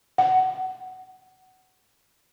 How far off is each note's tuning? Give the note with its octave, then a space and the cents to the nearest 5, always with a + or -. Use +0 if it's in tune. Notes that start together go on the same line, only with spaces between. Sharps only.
F#5 +15